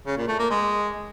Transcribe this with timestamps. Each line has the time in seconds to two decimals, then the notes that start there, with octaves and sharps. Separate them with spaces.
0.06 C#3
0.17 A#2
0.28 A3
0.39 A#3
0.50 G#3